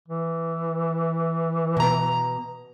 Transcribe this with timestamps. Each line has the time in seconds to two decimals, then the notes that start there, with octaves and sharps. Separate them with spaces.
0.08 E3
1.77 B2 A#5